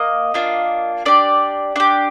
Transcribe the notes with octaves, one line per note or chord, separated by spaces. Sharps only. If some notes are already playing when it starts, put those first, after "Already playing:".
Already playing: A#3 D#5
A#3 D4 F4
D4 G4 D5
D4 G4